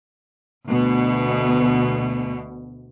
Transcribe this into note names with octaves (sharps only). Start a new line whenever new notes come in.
D2 B2